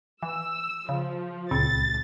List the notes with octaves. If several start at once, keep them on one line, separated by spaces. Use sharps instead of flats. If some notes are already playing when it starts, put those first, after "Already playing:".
E3 E6
C#3 F3
C#2 A#2 C4 A6